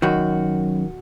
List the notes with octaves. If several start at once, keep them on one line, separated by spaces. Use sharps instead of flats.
F#2 D#3 F#4